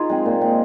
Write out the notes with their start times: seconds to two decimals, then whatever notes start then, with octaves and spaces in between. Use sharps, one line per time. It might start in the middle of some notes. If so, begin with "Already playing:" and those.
Already playing: D#4 F4 G#4 A#4
0.09 G#3 C4
0.25 A#2
0.41 G#3 C4